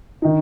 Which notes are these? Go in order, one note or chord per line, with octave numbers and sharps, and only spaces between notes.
D#3 D#4